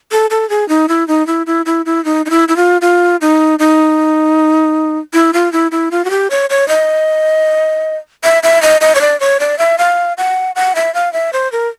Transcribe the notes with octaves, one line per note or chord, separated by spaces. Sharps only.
A4
A4
G#4
D#4
E4
D#4
E4
E4
E4
E4
D#4
D#4
E4
E4
F4
F4
D#4
D#4
E4
F4
E4
E4
F4
F#4
G4
C#5
C#5
D#5
E5
E5
D#5
D#5
C#5
D5
C#5
D5
E5
F5
F#5
F#5
E5
F5
E5
C5
A#4